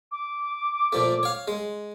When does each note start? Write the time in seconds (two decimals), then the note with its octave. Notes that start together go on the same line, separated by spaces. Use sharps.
0.11 D6
0.93 A#2 F3 A3
1.23 C#5 F5
1.48 G#3